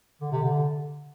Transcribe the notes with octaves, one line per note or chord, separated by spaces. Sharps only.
D3
C3
D3